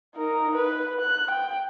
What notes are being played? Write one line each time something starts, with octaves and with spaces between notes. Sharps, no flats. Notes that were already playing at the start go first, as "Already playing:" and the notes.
D#4 A#4
B4
F#6
G5